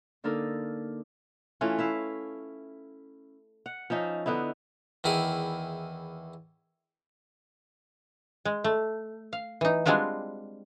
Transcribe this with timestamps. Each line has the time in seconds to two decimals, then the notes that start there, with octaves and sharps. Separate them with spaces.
0.24 D3 A#3 D4 D#4 A4 A#4
1.61 E3 A3 C#4 F4
1.79 E4 E5 F5
3.66 F#5
3.90 F3 C#4 D#4 E5
4.26 D3 B3 D#4 E4
5.04 E2 D#3 E4 G#4
8.45 G#3
8.64 A3
9.33 F5
9.61 E3 D#4
9.86 G3 G#3 C4 D4 F4 F#4